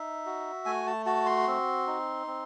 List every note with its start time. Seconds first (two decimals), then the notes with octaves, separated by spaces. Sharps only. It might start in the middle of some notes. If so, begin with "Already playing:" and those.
Already playing: D#4 E5
0.26 F#4
0.66 A3 G#5
0.87 A5
1.06 F#4 A5
1.26 C6
1.47 C4
1.87 D#4
2.27 C4